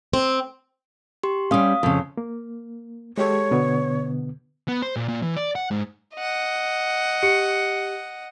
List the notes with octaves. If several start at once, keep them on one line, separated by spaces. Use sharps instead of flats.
C4
G4 C6
G3 C#4 F5 D#6
F2 C#3
A#3
G#3 G4 A4 C#5
B2 D3 B3
B3
C5
A#2
A#2
E3
D5
F#5
G#2
D#5 F#5
G4 C#7